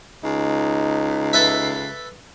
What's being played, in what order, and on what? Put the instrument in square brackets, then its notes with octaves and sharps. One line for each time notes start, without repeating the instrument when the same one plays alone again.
[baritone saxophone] C#2 [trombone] D#4
[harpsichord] A4 B4 E5